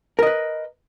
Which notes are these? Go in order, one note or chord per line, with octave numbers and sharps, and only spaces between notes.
A#4 B4 D#5